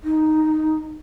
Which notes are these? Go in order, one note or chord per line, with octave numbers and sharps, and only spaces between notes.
D#4